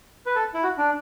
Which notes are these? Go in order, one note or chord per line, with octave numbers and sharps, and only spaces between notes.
B4
A4
E4
F#4
D4